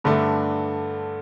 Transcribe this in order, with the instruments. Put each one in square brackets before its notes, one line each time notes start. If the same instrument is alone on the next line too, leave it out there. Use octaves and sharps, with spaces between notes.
[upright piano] G2 D3 A3